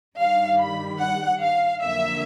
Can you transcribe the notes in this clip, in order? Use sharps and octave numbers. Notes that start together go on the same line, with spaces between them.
G2 D#3 G3 F5
B5
F#5
F5
F2 D3 F#3 A#3 E5